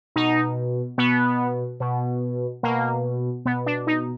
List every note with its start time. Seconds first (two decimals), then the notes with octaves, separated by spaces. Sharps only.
0.16 B2 D#4
0.98 B2 B3
1.80 B2
2.63 B2 A#3
3.45 B2 B3
3.66 D4
3.87 D#4